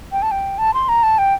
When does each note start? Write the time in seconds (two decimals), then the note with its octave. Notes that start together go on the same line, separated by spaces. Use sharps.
0.12 G5
0.22 A5
0.31 G5
0.58 A5
0.74 C6
0.89 A#5
1.03 A5
1.18 G5